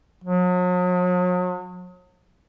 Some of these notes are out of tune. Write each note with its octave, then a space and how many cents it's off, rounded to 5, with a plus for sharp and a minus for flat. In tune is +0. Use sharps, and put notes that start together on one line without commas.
F#3 -40